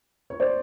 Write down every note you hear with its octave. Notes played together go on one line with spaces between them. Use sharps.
C#5
C5 D5